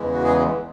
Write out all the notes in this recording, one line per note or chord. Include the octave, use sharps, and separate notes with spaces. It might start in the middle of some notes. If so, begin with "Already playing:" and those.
Already playing: E2 C#3 E3 G#3
F#4
G#4